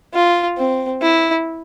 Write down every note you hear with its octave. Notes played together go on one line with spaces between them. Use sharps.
F4
C4
E4